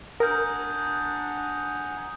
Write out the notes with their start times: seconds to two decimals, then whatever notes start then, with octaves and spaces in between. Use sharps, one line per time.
0.20 D4 A#4 F#5 G#5 A#5 D#6 G6